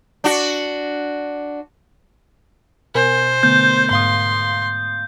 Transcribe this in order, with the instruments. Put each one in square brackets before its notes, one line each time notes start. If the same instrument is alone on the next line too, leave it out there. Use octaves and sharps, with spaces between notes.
[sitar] D4 F#4
[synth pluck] B2 A#4 G#5 [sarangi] C5
[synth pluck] D3 A3 B3 [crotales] G6
[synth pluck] G#2 F5 D#6 [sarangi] C6